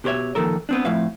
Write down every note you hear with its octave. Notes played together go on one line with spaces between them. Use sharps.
B2 G4 C5 C#5 E5
A#2 D#3 F3 A4 A#4
B3 C4 D4
F2 A2 E5 F5